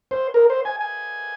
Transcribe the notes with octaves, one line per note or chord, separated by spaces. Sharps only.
C5
A#4
C5
G#5
G#5